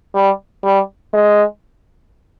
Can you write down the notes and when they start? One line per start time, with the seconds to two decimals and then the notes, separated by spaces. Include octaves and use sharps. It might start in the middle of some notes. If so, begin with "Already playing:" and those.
0.15 G3
0.64 G3
1.13 G#3